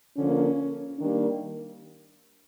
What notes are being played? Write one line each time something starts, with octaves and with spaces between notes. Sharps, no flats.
D3 F3 A#3 C#4
D#3 G3 A#3 D4